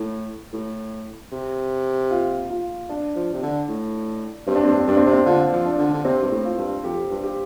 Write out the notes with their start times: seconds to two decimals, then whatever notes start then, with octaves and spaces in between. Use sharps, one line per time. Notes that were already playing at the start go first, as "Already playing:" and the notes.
Already playing: A2
0.53 A2
1.32 C3
2.11 F4
2.50 F4
2.89 D4
3.15 F3
3.33 C3
3.42 D3
3.68 A2
4.47 G2 C4
4.55 D4
4.64 G2 C4
4.72 D4
4.80 C4
4.87 G2 D4
4.97 C4
5.05 C3 D4
5.13 C4
5.26 D3 F4
5.53 F3
5.65 D4
5.79 D3
5.94 D3
6.04 C3 C4
6.23 G2
6.31 A2
6.44 F4
6.58 G2
6.84 F2 G4
7.11 G2
7.24 G4